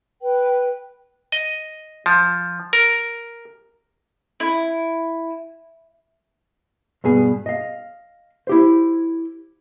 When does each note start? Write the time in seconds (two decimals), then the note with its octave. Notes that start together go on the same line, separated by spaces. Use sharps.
0.22 B4 G5
1.32 D#5
2.06 F3
2.73 A#4
4.40 E4
7.04 G2 B2 G#4
7.46 D#5 F5
8.47 E4 G4 C5